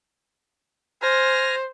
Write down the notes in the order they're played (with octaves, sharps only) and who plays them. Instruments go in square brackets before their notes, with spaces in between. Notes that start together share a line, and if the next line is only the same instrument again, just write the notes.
[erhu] C5 [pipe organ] G#5 F6 A#6